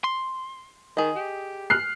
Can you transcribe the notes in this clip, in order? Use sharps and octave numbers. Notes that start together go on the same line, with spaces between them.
C6
D#3 G#4 D#5
G4
F6 F#6 C7